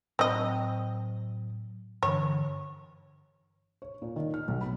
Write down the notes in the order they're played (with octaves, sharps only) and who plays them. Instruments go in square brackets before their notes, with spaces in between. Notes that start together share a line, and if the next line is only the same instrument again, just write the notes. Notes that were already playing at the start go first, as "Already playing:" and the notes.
[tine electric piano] A2 F#3 [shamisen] C4 D#5
[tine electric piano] G2 D3 E3 [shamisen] C#5
[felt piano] C#5
A#2
D#3
F6
B1
B5